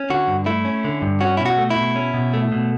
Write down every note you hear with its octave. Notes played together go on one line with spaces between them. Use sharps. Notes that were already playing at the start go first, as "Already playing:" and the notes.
Already playing: C#4
D3 F#4
G2
A3 E4
C#4
D3
G2
C#4 F#4
B2 E4
F#4
A3
E4
B2
C#4
B2
A3
B2